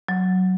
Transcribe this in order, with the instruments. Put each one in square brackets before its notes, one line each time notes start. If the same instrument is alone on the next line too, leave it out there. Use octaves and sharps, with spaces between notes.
[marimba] F#3